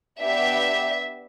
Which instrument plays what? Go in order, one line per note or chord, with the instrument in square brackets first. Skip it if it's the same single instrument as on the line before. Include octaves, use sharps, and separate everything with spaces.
[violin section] B3 D4 G4 E5